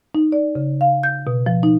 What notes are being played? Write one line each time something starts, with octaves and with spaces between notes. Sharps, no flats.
D#4
D5
C#3
F5
G6
B2
F3
D#4